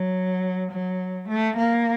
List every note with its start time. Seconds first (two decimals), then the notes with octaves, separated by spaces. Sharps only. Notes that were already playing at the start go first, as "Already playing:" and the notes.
Already playing: F#3
0.71 F#3
1.28 A3
1.56 A#3